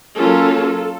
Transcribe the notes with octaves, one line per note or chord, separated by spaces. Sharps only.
F#3 A#3 C#4 F4 A4